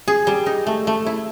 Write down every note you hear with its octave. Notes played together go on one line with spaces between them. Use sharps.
G#4
G3
D#4
A3
A3
E4